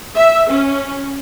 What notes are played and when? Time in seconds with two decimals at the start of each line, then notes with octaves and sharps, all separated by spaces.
0.15 E5
0.49 C#4